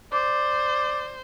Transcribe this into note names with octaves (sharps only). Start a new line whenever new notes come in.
C5 D5